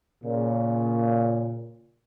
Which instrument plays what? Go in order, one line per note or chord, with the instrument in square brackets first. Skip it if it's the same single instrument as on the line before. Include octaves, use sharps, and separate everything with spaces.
[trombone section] A#2 C#3